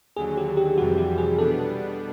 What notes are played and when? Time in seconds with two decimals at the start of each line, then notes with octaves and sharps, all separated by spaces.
0.16 D#2 D3 F#3 G#4
0.37 G4
0.57 G4
0.77 F2 C3 E3 G3 F#4
0.98 G4
1.18 G#4
1.38 B2 G3 B3 D4 A4